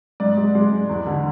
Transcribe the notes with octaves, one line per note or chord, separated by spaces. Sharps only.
G#2 D5
G#3
G#3
G#2
E2
D3